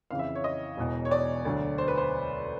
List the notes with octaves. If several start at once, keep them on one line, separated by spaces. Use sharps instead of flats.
F2 C#3 E3 F5
E5
C#5
D#5
E1 E2 B2
C#5
D5
D2 D3 F#3
C5
B4
C5